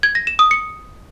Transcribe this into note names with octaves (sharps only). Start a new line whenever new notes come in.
G#6
A#6
E7
D#6
C#7